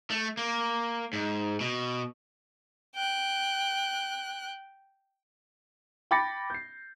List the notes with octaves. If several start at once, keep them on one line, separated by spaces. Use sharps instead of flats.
A3
A#3
G#2
B2
G5 F#6
G5 B5 D6 A6 A#6 C#7
G6 C7